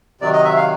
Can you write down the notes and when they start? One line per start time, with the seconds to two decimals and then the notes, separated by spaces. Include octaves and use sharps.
0.21 C3 D#3 F#3 D5
0.33 D#5
0.45 E5
0.57 F5